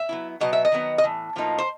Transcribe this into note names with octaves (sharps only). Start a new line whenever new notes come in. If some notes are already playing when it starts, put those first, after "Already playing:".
Already playing: E5
F#3 B3 E4
B2 F#3 B3 D#5
E5
D#5
D#3 F#3 B3
D#5
A2 E3
A2 F3 A#3 D#4
C5